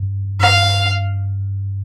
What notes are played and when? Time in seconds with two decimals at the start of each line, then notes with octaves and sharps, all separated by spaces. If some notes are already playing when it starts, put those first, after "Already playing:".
Already playing: G2
0.39 G2 F5